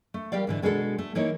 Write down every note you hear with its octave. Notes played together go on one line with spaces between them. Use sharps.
A3
G3 G4 A#4 D5 F5
G#2 D3 E3
B2 G#3 D4 F#4 G#4 A4
A3
E3 A#3 D#4 A#4 C#5